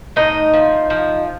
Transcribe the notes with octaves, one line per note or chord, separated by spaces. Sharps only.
A2 D#4 D#5
F3
F3